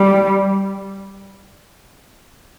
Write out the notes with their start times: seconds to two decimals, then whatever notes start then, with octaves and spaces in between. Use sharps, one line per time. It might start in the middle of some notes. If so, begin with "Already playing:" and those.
Already playing: G3